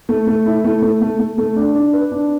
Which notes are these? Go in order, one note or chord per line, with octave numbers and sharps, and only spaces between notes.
A3
A3
E4
A3
A3
A3
A3
A3
D4
D4
B4
D4